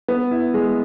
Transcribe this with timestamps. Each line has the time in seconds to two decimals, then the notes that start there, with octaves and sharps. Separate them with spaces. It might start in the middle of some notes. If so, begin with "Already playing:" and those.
0.08 B3
0.31 E4
0.54 G#3